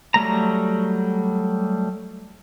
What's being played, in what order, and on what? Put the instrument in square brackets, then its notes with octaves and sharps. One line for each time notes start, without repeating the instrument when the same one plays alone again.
[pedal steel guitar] F#3 G3 A3 A#5